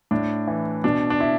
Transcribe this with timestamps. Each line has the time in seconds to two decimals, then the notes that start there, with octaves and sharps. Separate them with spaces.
0.11 A2 D4
0.47 E3
0.84 B2 D4
1.10 D4
1.20 E4